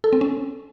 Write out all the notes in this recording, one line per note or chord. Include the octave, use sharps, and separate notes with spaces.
A4
C4
C#4